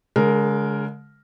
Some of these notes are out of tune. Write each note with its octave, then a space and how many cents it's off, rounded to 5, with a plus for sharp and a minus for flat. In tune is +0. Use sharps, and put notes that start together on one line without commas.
D3 -45 G#3 +10 A#4 +0